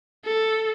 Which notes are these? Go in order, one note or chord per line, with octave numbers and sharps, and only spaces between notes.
A4